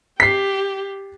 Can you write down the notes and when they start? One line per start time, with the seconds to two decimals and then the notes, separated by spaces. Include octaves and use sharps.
0.20 G4 B6 C7